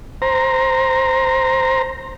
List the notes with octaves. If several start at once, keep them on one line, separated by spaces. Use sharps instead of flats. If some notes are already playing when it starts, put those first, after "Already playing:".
C5 A#5